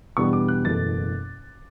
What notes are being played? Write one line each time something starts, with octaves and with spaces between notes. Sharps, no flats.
E2 B2 G3 B3 D4 C#6
D6
F#6
F#1 E2 B2 A3 A6